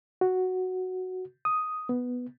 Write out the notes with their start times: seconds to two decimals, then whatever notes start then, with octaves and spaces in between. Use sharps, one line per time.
0.21 F#4
1.45 D#6
1.89 B3